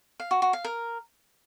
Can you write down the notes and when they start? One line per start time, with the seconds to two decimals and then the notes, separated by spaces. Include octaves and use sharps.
0.20 F5
0.31 F#4
0.42 F#4
0.53 F5
0.64 A#4